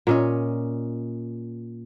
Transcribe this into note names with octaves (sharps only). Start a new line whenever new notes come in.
A#2 C#4 D#5